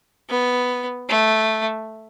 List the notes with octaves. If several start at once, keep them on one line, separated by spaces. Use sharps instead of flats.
B3
A3